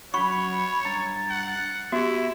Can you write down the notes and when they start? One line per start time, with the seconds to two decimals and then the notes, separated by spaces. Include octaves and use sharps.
0.14 F#2 F#4 C#5 B5 C#6
0.85 G2 A#5 A6
1.30 F#5
1.92 B3 E4 F#4 G4 E5